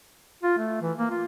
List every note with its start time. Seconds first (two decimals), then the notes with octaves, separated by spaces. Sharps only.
0.43 F4
0.57 A3
0.82 E3
0.98 A#3
1.11 F4